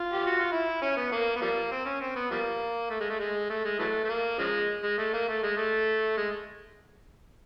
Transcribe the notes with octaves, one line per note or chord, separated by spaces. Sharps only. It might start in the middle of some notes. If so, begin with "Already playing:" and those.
Already playing: F4
G4
F#4
F4
E4
C#4
B3
A#3
B3
F3 G3 A#3
C4
C#4
C4
B3
F3 G3 A#3
A3
G#3
A3
G#3
A3
G#3
E3 F#3 A3
A3
A#3
C#3 F3 G#3
G#3
A3
A#3
A3
G#3
A3
G#3